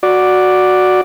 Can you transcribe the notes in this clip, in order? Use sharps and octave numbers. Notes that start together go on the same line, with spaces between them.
F#4 D5